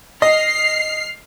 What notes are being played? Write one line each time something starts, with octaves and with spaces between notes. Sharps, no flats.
D#5 F6 C7